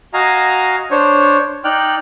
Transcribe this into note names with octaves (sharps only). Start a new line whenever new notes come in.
F#4 D#5 F5 G#5 A#5
D4 C5 C#5
D#4 D5 G5 F6 F#6